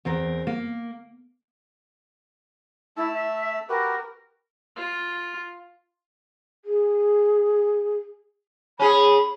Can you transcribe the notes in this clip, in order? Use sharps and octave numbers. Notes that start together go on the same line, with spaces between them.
E2 C4 A#4
A#3
A3 E4 A5 E6
E5
F#4 G4 A#4 B4
F4
G#4
C#4 G#4 C#5 B5